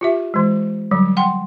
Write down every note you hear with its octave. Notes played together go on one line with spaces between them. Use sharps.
F4 G4 E5
E3 G#3
D3 F#3 G3
F#5 G5 C6